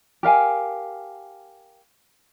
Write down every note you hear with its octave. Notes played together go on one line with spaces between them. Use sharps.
G4 A#4 F5 G#5